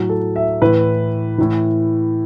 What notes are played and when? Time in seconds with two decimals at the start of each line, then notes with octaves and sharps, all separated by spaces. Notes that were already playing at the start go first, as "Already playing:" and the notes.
Already playing: A2 F#3
0.09 A4
0.36 E5
0.62 A2 E3 B4
1.38 A2 E3